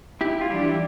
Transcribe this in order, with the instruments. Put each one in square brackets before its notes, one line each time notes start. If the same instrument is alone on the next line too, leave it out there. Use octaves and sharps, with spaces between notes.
[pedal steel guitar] E4 G4
F4
[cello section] E3 G3 D4 [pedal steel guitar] E4 G4